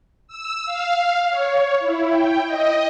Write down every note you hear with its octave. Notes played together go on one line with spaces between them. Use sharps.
E6
F5
C#5
E4
G5
D#5